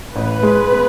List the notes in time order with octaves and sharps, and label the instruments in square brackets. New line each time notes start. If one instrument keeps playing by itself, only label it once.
[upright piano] A1 [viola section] B4
[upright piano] G#3
B3